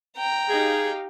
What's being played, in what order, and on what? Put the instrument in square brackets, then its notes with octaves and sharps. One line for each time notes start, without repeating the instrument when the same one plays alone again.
[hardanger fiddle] G5 A#5
[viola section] D#4 G4 F5 [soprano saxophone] G#4